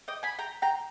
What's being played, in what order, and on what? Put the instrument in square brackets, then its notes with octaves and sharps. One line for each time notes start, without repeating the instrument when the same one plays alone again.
[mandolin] D#5 G5
G#5 B5
G5 A#5
G5 A#5